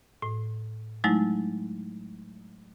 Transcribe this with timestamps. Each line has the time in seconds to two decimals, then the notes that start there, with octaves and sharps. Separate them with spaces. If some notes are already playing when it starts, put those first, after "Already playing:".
0.22 A2
1.04 F#3 G#3 A3 D#4 E4